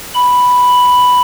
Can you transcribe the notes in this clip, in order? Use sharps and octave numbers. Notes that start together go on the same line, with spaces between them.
B5